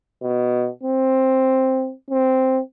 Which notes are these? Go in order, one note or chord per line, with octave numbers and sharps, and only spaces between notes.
B2
C4
C4